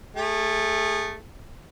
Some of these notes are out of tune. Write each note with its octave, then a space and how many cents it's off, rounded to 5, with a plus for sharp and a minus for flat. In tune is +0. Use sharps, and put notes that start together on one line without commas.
A3 +0 G#4 -30